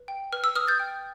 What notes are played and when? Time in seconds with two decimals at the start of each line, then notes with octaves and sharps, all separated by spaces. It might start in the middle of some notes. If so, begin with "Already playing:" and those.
Already playing: B4
0.08 G5
0.33 B4 F6
0.44 E6
0.55 B4 D#6 F6
0.67 G6 A6
0.80 G5